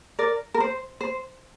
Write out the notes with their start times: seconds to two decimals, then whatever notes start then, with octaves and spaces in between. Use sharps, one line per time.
0.19 A#4 D5
0.54 A#4
0.60 C5
1.01 C5